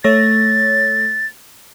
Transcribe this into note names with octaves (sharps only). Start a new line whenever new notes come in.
A3 C#5 A6 A#6